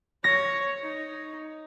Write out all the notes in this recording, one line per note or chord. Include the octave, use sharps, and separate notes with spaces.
C#5 A#6
D#4